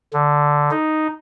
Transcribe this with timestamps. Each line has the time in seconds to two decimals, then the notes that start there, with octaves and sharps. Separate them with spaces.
0.13 D3
0.71 D#4